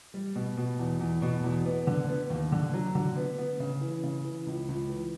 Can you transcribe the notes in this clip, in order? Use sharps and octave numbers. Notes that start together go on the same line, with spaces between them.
G3
B2
B2
E2
E2
B2
E2
B3
D3
B3
D#2
D3
F#3
D3
B3
B3
C#3
E3
C#3
E3
C#2
C#2
E3